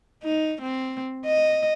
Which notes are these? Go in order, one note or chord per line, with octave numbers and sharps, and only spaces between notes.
D#4
C4
D#5